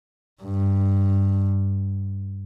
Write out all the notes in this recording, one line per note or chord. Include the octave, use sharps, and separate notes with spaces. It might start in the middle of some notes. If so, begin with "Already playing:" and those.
G2